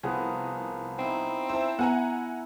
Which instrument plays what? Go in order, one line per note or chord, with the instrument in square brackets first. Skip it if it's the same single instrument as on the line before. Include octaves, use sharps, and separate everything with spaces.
[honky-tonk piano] C2 G#4 [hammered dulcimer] F3 B3 A#4
[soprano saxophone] C4 [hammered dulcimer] D#4 E4
[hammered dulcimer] E4 E5 [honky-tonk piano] C5 A5
[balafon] B3 [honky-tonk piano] F#5 G#5 A#5